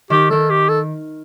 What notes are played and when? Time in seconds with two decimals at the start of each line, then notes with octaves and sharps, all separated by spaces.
0.10 D#3 G4
0.30 D#3 A4
0.50 G4
0.69 A4